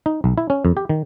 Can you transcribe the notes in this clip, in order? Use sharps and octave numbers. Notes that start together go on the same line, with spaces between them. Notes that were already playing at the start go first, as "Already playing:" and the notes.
D#4
B1
E4
C#4
F2
G4
D#3